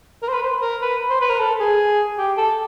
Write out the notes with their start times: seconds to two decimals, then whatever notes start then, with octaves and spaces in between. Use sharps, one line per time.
0.23 A#4
0.28 C5
0.33 B4
0.43 C5
0.62 A#4
0.82 B4
1.10 C5
1.21 B4
1.30 A#4
1.39 A4
1.60 G#4
2.18 G4
2.37 A4